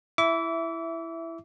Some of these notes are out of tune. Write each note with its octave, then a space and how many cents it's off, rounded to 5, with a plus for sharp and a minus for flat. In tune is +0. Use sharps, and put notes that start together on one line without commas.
E4 +10 E5 +0 D6 -35